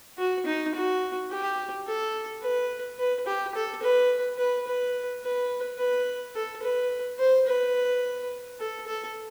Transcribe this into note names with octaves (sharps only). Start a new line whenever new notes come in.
F#4
D#4
F#4
G4
A4
B4
B4
G4
A4
B4
B4
B4
B4
B4
A4
B4
C5
B4
A4
A4